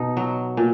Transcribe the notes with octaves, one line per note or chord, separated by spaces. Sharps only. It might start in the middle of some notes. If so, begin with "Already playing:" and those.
Already playing: B2 D#4
F#3
A#2